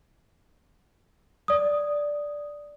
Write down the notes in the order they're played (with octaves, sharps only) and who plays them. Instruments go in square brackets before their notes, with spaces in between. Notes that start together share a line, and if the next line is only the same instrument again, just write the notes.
[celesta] D5 D#6